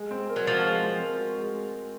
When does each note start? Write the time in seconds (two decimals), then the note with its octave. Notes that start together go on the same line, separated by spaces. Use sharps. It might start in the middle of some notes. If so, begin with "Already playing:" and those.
Already playing: G#3
0.11 C4
0.29 A#4
0.36 F#3
0.47 F3 F#4
0.65 G#3
0.83 C4
1.01 A#4
1.19 F#4
1.37 G#3